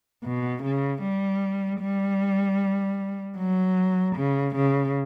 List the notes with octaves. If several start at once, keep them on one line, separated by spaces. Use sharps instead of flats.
B2
C#3
G3
G3
F#3
C#3
C#3